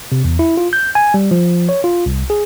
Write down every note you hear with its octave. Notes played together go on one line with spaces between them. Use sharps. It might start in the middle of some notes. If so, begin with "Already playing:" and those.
C3
E2
E4
F4
G6
G#5
G3
F3
C#5
F4
C2
G#4